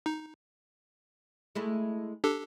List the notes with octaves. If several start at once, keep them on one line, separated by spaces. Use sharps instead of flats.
D#4
G#3 A3 E4
D4 G4 A4